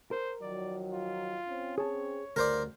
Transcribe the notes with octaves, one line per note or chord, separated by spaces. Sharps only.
A#4 C5
D#3 F3 F#3 D5
F4
C4 C#4
G#4 C#5 A5
D2 G2 C#3 A#4 C5 D5